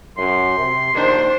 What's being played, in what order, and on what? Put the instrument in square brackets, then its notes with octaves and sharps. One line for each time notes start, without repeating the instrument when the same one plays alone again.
[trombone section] F#2 [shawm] C6
[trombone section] C3
[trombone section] A#1 D#2 D#3 [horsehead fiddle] D4 C5